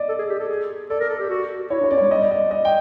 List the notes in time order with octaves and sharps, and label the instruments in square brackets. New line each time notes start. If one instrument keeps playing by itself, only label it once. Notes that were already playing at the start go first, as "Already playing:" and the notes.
Already playing: [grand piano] D5 D#5
[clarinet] A4
G#4
G4
A4
G#4
[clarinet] A4 [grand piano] D5
[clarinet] A#4
A4
G4
F#4
[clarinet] E4 [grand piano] C#5
[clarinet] D4
[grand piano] C#5
[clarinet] C#4 [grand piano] D5
[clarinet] G3 [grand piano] C#5
[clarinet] G3 [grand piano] D#5
[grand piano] D5
D#5
D#5
G5